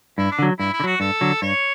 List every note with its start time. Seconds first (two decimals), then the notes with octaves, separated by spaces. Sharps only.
0.18 G2 E4
0.32 D4
0.39 D3 F#3
0.59 G2 E4
0.73 E4
0.80 D3
0.84 F#3 F#4
1.00 G2 A4
1.21 D3 F#3
1.42 G2 C#5